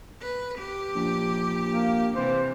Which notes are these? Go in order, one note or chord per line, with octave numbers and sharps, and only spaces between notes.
B4
G4
A#1
A#3
C3 E3 C5